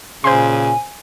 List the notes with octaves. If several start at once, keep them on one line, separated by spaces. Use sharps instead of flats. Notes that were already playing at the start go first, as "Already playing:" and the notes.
A#2 C#3 C5 G#5 C6